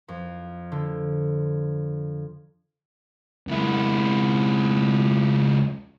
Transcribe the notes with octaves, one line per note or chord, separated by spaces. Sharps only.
F2
D3
C#2 E4